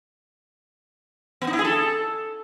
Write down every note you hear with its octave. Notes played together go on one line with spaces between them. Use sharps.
B3
D#4
E4
G#4
A4